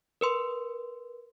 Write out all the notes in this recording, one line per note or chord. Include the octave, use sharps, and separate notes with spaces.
A#4 B4 C6